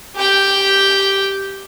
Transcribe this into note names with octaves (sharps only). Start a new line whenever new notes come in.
G4 G5